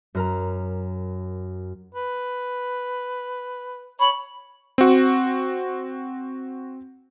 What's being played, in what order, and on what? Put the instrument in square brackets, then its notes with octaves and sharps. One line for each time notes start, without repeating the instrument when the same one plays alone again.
[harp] F#2 A#4 A#5
[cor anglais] B4
[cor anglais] C#5 [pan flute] B5
[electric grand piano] C4 F#4